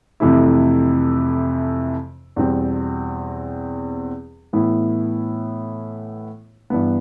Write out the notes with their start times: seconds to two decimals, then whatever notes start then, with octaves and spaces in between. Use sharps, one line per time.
0.20 F2 C3 E3 A3 E4
2.36 E2 B2 G3 C4
4.53 A2 E3 B3 E4
6.70 G2 E3 B3